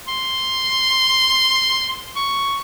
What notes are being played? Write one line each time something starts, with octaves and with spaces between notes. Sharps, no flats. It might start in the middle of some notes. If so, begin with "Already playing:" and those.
C6
C#6